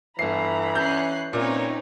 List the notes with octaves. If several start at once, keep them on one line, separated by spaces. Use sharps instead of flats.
G1 E3 A#5 B5 C7
C#4 F#6 G6 C7
A#2 C4 C#4 D#4 B4 C#5